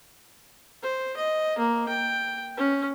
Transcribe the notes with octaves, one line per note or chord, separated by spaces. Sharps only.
C5
D#5
A#3
G5
C#4